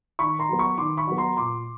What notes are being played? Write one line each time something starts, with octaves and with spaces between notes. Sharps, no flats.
D#3 B5 C#6
A#5 C6
F#3 B3
B5 C#6
D#3 C6 D6
B5 C#6
F#3 B3
A#5 C6
A#2 C6 D6